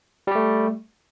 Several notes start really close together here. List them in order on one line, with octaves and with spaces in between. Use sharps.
G3 G4 A3